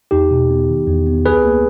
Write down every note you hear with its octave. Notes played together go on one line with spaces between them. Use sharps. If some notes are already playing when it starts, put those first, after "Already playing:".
E2 D#4 G4
B2
B3
D#3
E2
B3
C#2 G#4 B4
A#3